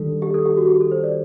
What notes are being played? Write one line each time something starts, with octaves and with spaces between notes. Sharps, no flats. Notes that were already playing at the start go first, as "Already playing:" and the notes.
Already playing: D#3 G3 D4 A4
G4
A4
G4
F#4
G4
A4
C5
D5